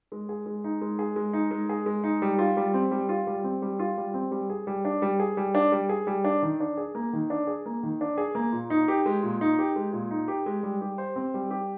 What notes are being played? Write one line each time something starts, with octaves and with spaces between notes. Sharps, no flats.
G#3
G#4
G#3
D#4
G#3
G#4
G#3
D#4
G#3
G#4
G#3
D#4
G3
F4
G3
C4
G3
F4
G3
C4
G3
F4
G3
C4
G3
G#4
G3
D4
G3
G#4
G3
D4
G3
G#4
G3
D4
D#3
D4
G#4
A#3
D#3
D4
G#4
A#3
D#3
D4
G#4
A#3
A#2
D#4
G4
G#3
A#2
D#4
G4
G#3
A#2
D#4
G4
G#3
G3
G4
C5
C4
G3
G4